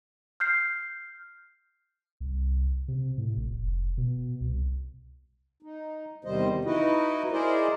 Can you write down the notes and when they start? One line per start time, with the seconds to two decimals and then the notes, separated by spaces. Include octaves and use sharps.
0.40 F6 G6 C7
2.21 C2
2.88 C3
3.18 A2
3.37 A#1
3.51 F1
3.98 B2
4.41 C2
5.63 D#4
6.25 E2 C3 D#3 G3 C5 D#5
6.65 D#4 E4 F#4 B4 D#5
7.31 E4 G#4 A#4 C5 D5 D#5